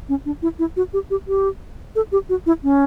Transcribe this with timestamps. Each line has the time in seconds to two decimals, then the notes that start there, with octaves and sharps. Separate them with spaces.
0.09 C#4
0.26 D4
0.42 E4
0.59 E4
0.77 F#4
0.93 G4
1.10 G4
1.28 G4
1.96 A4
2.12 G4
2.29 F#4
2.46 E4
2.63 C#4